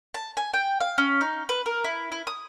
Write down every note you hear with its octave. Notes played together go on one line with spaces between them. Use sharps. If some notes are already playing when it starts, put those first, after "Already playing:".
A5
G#5
G5
F5
C#4
D#4
B4
A#4
E4
E4
D#6